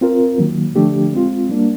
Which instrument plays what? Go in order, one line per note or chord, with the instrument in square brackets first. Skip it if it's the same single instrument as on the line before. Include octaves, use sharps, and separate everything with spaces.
[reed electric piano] C4 F4 A#4
D#3 F#3 A#3
D3 F3 A3 D4 G4
G#3 C4 F4
G3 A#3 D4